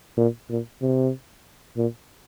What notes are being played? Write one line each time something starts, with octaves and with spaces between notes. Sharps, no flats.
A#2
A#2
C3
A#2